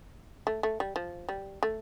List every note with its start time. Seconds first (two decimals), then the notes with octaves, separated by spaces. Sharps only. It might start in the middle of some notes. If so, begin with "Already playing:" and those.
0.47 A3
0.63 A3
0.80 G3
0.96 F3
1.29 G3
1.63 A3